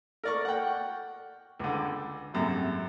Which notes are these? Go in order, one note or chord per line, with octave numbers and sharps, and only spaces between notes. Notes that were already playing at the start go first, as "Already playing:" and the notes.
A#4 D5 C#6
F#5 G5
C#2 D3
G#1 F#2 C3